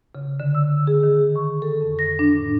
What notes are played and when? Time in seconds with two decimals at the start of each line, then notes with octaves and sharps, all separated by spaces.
0.15 C#3
0.40 D3
0.55 E6
0.87 G#4
1.03 D#3
1.36 C#6
1.62 A4
1.81 F2
1.99 A#6
2.19 D4
2.38 A2